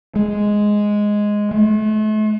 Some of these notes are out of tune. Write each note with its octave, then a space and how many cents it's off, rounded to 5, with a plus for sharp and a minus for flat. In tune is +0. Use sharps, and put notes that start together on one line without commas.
G#3 +0
A3 -40